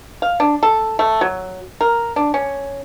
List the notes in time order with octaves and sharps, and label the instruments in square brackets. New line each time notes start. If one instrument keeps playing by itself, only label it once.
[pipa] F5
D4
A4
A3
F#3
A#4
D4
C#4